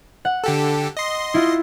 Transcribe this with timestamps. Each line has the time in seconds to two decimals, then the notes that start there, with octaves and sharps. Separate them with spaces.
0.25 F#5
0.44 D3 G4 A4
0.97 D#5 C6
1.34 E4 F4